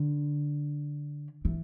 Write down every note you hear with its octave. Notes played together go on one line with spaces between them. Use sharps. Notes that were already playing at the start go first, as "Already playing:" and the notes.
Already playing: D3
E3